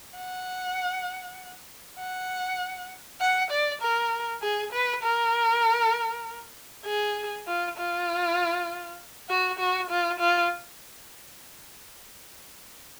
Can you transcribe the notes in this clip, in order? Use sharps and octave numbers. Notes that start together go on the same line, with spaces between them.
F#5
F#5
F#5
D5
A#4
G#4
B4
A#4
G#4
F4
F4
F#4
F#4
F4
F4